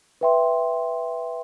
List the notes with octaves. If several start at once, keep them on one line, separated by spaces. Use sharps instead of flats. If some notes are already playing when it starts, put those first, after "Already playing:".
B4 E5 G5 C6